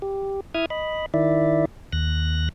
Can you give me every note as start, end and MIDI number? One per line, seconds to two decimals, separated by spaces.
0.02 0.40 67
0.54 0.66 64
0.54 0.66 76
0.54 0.66 87
0.54 0.66 89
0.54 0.66 92
0.70 1.06 75
0.70 1.06 83
1.14 1.65 51
1.14 1.65 64
1.14 1.65 74
1.14 1.65 76
1.92 2.49 39
1.92 2.49 90
1.92 2.49 94